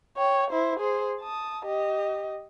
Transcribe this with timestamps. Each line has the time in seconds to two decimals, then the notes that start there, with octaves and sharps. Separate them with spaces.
0.17 C#5 G5
0.50 E4 C5
0.80 G#4 C5
1.20 A5 D#6
1.65 G4 D#5